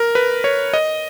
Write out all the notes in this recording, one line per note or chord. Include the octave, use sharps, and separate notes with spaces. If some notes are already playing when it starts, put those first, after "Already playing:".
Already playing: A#4
B4
C#5
D#5